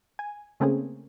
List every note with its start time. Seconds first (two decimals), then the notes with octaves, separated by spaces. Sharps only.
0.19 G#5
0.60 C#3 A3 A#3 C4 C#4 G#4